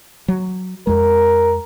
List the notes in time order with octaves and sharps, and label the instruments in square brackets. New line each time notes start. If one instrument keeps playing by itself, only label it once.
[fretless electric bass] F#3
[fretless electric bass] F2 G#3 [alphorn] A#4